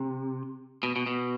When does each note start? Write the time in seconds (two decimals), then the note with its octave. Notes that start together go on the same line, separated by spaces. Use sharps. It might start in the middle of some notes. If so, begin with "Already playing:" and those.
Already playing: C3
0.83 B2
0.96 B2
1.06 B2